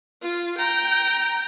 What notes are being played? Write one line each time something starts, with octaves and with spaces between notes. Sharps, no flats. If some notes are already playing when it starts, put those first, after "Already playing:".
F4
G5 A#5